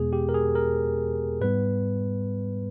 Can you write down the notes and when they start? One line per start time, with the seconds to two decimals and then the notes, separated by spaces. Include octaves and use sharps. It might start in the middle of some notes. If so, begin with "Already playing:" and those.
Already playing: E2 B2 G#3 B3 G#4
0.13 G4
0.29 A#4
0.34 G#4
0.55 A#4
1.41 G#2 G3 B3 B4